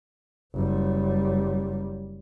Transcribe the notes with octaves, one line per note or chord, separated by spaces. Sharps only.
F#1 G3